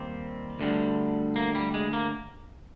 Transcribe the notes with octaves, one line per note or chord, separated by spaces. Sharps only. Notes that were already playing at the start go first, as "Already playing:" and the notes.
Already playing: D#2 D#3 G3 C4
D2 D3 G3
A#3
G3
G#3
A#3